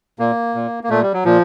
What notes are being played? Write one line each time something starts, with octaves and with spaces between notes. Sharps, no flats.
A#2 A#3
A#2
A#3
A#2 A3
G3
F#3
A#2 F3